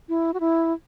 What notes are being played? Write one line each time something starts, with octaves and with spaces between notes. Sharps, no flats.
E4
F#4
E4